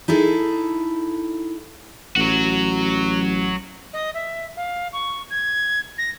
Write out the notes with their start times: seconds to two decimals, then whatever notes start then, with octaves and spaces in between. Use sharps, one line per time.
0.08 D#4 E4 G#4 A4
2.16 A1 F#3 F#4
3.93 D#5
4.14 E5
4.57 F5
4.93 C#6
5.31 G#6
5.98 A#6